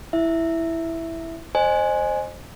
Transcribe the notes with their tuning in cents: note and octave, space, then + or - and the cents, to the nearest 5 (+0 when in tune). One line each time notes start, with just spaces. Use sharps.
E4 +0 E5 +0
C5 +15 D#5 -30 G#5 +5